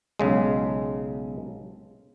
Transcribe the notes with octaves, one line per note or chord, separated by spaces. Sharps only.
B1 C#3 G#3